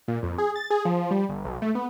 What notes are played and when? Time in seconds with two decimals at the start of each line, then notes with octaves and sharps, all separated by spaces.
0.08 A#2
0.23 F2
0.38 G#4
0.56 A6
0.70 G#4
0.85 F3
1.11 G3
1.29 G1
1.45 B1
1.62 A3
1.75 B3